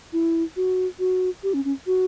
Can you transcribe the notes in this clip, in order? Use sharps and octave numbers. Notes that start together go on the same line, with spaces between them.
E4
F#4
F#4
G4
C#4
C#4
F#4